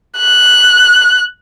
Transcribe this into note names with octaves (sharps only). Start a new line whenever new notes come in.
F#6